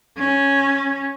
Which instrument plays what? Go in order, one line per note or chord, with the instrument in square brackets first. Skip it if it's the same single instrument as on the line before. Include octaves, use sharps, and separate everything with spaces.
[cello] C#4